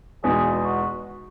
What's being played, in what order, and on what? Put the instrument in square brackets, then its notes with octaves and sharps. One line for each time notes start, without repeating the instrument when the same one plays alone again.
[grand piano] E2 B2 G#3 B3 D#4 [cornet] G#4
[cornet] F#4